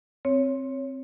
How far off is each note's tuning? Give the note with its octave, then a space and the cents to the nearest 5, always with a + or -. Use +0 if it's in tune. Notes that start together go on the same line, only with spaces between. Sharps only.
C4 +10 C#5 +0